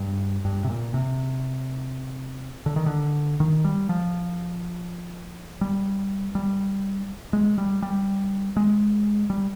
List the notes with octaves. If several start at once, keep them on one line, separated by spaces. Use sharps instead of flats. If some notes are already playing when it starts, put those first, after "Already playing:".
Already playing: G2
G2
C3
A#2
C3
D3
D#3
D3
D#3
G3
F3
G3
G3
G#3
G3
G3
G#3
G3